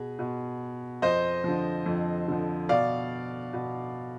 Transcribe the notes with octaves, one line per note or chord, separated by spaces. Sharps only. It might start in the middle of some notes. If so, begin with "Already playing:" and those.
Already playing: B2 G#4
B2
F2 C5 D#5
D3 F3
F2
D3 F3
B2 D5 F5
B2